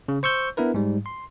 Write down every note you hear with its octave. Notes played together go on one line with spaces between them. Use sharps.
C#3
C5 C#6 E6 G6
B3 D4 E4 A#4 B4
G#2 G3
C6